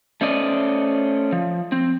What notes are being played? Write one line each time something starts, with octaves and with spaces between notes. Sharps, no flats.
A3 C#4 C5 D5 D#5
F3
C4